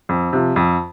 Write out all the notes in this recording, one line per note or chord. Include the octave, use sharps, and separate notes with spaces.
F2
C3 F3
F2